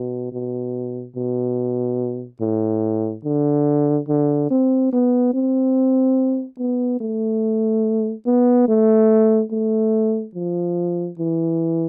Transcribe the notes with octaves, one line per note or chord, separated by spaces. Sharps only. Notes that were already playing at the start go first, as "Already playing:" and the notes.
Already playing: B2
B2
B2
A2
D3
D3
C4
B3
C4
B3
A3
B3
A3
A3
F3
E3